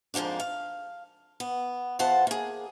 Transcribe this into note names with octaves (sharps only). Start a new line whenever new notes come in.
F2 G#2 F3 A#3 D4
F5
B3
E2 F4 C5 F#5 A5
A#3 G#4